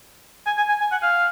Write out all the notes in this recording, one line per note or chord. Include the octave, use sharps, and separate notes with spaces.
G#5
G#5
G#5
G#5
F#5
F5